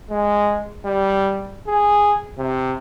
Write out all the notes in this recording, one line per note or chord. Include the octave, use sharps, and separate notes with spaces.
G#3
G3
G#4
C3